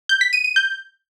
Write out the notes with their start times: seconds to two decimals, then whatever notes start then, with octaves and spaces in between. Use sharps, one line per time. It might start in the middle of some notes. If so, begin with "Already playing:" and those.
0.09 G6
0.21 B6
0.33 D#7
0.44 D#7
0.56 G6